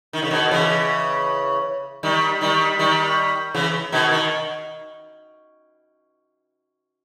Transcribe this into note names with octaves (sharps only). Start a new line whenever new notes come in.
D#3
C#3
B2 D#3
C#3 E3
D#3 G3
D#3 G3
D#3 G3
C#3 E3
B2 D#3
D#3